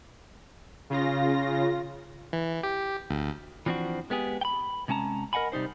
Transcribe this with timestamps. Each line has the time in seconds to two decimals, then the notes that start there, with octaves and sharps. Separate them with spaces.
0.90 C#3 F4 A#6
2.33 E3
2.63 G4
3.10 D2
3.66 E3 F3 C4 D4 F#4
4.10 G#3 B3 G4 G#4
4.41 G5 B5
4.88 C3 G#3 C#4 A5 A#5
5.33 A#4 D#5 F#5 G#5 B5
5.52 C3 G3 D#4 C5